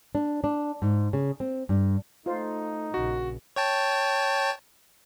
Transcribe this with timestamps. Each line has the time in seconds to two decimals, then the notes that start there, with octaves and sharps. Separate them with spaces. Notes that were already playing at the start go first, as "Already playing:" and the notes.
0.15 D4
0.44 D4
0.82 G#2
1.13 C#3
1.40 C4
1.69 G2
2.26 A3 D#4 F4 C5
2.94 A#1 C#3 F#4
3.56 C#5 G5 A5